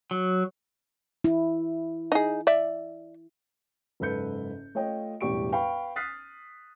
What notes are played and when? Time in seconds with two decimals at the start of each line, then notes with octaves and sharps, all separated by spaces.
0.11 F#3
1.24 E4
2.12 D#4 G#4
2.47 D5 E5
4.00 F#1 G#2 A4 B4 G6 C#7
4.75 A3 F4 C#5 D#5 G5
5.21 E1 A2 G3 G4 C#6 D7
5.52 B4 F5 G5 B5 C#6
5.96 D#6 F6 F#6 A6 B6 C7